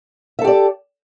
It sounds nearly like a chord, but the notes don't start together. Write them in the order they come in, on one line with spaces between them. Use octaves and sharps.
E5 A4 G4 D5